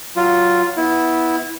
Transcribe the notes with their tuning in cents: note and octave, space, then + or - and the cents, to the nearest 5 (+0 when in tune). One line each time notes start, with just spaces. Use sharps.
F#3 +15 F4 +0
B3 +0 E4 -15